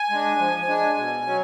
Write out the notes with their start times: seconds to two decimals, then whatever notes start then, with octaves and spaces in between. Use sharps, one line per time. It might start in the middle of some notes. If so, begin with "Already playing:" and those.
Already playing: G#5
0.10 G#3 D4
0.39 F3
0.67 G#3 D4
0.97 B2
1.26 F#3 C#4